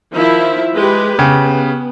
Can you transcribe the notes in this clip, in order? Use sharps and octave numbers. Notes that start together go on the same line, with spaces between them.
D#3 F3 E4
G#3 G4 B4
C#3 B3 G4